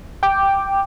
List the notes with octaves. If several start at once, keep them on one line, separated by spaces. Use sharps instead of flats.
G5 D6